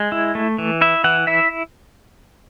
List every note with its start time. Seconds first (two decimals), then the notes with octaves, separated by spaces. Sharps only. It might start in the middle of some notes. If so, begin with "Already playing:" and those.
Already playing: G#3
0.12 E4
0.35 A3
0.58 E3
0.81 E4 E5
1.04 E3 F#5
1.27 E4 E5